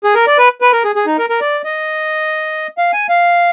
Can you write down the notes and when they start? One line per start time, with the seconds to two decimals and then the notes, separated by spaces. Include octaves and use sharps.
0.04 G#4
0.15 A#4
0.27 D5
0.38 B4
0.61 B4
0.73 A#4
0.84 G#4
0.95 G#4
1.07 D#4
1.19 A#4
1.30 A#4
1.41 D5
1.64 D#5
2.78 F5
2.93 G#5
3.09 F5